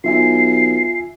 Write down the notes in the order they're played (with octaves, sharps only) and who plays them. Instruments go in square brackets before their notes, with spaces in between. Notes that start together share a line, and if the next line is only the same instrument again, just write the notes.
[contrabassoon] B1 [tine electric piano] F4 E5 G#5 [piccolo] C7